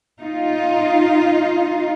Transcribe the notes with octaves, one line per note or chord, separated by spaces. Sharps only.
D#4 F4